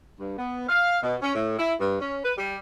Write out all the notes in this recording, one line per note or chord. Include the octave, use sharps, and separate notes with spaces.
G2
B3
F5
B2
C#4
A2
E4
G2
C#4
B4
G3